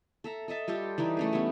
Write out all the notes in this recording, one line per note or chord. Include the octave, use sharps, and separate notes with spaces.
A4 E5 A#5
A4 D#5 E5 A5
G3 F4 G4 A4
E3 G3 D#4 D5
A3 C#4 G#4
G3 B3